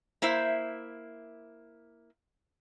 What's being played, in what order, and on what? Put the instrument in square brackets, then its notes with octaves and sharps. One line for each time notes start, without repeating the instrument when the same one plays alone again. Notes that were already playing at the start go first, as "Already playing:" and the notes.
[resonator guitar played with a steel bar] A#3 E4 C5 E5